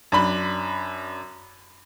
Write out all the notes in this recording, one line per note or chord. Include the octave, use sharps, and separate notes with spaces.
F#2 D4 B5